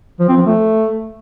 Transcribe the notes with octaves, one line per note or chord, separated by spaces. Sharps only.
F3
C4
F3
A3